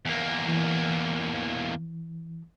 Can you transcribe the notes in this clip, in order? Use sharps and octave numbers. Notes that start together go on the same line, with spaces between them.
E2 A#3
E3